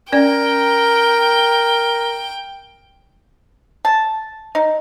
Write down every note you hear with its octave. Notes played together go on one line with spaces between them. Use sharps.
C#4 A#4 D5 G5
A5
D#4